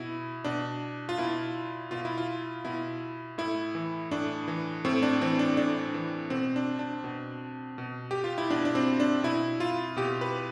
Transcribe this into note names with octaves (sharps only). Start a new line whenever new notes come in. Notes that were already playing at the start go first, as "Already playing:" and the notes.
Already playing: B2 E4
B2 D4
F4
B2 E4
B2 F4
E4
F4
B2 E4
A2 E4
E3
A2 D4
E3
A2 C4
D4
E3 C4
D4
A2 D4
E3
B2 C4
D4
D4
B2
B2
G4
F4
E4
B2 D4
D4
C4
D4
B2 E4
F4
B2 G4
B4